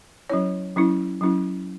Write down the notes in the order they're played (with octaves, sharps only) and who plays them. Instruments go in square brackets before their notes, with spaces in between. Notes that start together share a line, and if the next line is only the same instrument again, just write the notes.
[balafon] F#3 C#4 E4 C#5
F#3 C#4 E4
F#3 C#4 E4